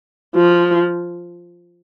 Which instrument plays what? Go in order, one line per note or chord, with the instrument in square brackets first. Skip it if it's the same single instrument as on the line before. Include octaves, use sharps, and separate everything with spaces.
[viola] F3